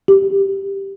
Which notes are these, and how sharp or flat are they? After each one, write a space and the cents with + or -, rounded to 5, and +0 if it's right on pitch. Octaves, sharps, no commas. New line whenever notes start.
G4 +0